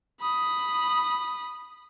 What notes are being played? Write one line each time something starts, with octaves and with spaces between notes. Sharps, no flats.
B5 D#6